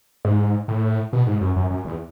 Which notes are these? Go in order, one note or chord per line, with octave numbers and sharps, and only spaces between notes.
G#2
A2
B2
G#2
F#2
F#2
F#2
E2